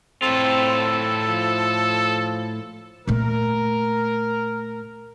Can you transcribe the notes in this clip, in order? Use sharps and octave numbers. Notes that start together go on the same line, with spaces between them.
A2 C4 F4 A4
F3
A#2 A3 A#4